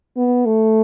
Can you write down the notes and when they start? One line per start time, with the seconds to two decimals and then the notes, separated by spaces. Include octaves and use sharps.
0.17 B3
0.46 A3